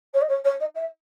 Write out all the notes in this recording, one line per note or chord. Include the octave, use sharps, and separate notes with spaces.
C#5
D#5
C#5
C#5
D#5
E5